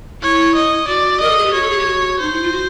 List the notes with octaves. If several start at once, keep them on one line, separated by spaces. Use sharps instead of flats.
E4 C#5
D#5
F#4 D5
A#4 D#5
A4
G#4
G4
F#4 C#5
A4
G#4
G4
F#4
D#4 C5
E4
F4
F#4